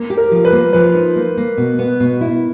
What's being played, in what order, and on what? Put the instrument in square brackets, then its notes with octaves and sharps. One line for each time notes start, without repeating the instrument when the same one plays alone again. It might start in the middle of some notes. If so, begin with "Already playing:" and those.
Already playing: [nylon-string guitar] A#3
G4
[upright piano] A#4
[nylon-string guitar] F3
[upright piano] B4
[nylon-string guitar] A#3
[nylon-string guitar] F3 [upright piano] B4
[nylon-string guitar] D#4
A#3
A#3
B2
B3
B2
E4